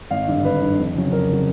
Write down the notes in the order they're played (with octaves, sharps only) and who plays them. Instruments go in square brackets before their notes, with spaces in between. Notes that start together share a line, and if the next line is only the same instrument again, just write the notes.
[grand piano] G#1 F5
G2 D3
G#1 B4
G2 D3
F2
C#3 F#3
F2 A#4
C#3 F#3